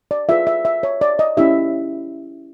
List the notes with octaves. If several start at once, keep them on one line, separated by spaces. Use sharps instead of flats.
D5
F4 G#4 B4 E5
E5
E5
C#5
D5
D#5
C#4 E4 G4 E5